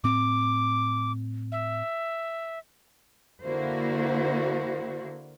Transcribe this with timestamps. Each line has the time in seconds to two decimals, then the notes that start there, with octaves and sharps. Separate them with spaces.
0.04 A2 C4 D6
1.52 E5
3.43 D3 A#3 E4 F#4 C5